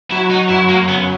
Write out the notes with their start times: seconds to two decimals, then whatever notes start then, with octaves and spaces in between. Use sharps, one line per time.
0.11 F#3 E4
0.31 D#4
0.49 F#2 E4
0.69 A#3
0.88 C#3 B3